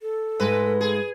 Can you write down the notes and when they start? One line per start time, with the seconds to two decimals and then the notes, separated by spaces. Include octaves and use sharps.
0.02 A4
0.40 G#2 G#3 A3 B4
0.81 G#4